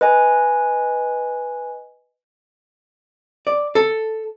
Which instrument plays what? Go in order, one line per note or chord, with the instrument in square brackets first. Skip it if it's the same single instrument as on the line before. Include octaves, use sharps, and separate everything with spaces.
[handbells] B4 D#5 G#5
[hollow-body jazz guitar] D5
A4